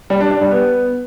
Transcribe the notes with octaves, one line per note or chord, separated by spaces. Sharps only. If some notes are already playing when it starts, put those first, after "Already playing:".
G3
D4
D4
G3
B3